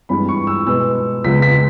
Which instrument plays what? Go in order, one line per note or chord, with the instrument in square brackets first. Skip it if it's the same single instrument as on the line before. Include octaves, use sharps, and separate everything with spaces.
[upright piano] G2 E3 G#3 B5
C#6
E6
B2 G#3 B3 E6
C#2 C#3 G#3 B3 B6
B6